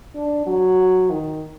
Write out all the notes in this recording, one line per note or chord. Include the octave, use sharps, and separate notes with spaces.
D4
F#3
D#3